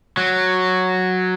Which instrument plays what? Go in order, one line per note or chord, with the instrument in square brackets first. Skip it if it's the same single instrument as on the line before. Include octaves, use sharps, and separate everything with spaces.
[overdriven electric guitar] F#3